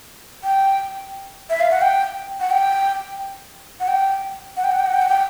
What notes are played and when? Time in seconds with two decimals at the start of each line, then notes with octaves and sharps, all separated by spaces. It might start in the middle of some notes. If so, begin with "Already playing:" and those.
0.44 G5
1.50 E5
1.60 F5
1.71 F#5
1.82 G5
2.40 F#5
2.50 G5
3.80 F#5
3.88 G5
4.57 F#5
4.64 G5
4.72 F#5
4.79 G5
4.86 F#5
4.94 G5
5.02 F#5
5.09 G5